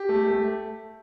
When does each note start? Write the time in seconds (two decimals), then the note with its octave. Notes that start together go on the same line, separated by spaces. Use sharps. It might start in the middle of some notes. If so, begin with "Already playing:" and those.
Already playing: G4
0.09 A3
0.27 A3